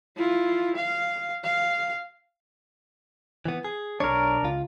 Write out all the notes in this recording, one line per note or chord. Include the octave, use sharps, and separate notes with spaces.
E4 F4
F5
F5
E3 B3
G#4
B1 D4 A#4 C#5
C#2 F4